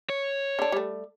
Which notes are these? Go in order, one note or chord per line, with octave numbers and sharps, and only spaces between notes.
C#5
D3 D4
G3 A3